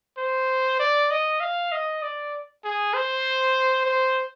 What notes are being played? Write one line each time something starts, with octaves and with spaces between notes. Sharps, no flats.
C5
D5
D#5
F5
D#5
D5
G#4
C5
C5